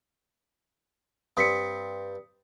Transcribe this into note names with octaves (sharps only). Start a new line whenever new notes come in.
G2 C4 D#6 B6 C#7